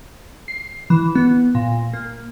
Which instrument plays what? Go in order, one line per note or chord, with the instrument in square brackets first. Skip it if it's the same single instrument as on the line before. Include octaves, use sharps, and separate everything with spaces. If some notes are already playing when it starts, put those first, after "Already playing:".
[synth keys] C7
E3
B3
A#2
A#3